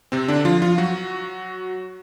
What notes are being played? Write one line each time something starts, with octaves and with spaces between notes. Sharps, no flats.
C3 C4
D3 D4
F3 F4
F3 F4
F#3 F#4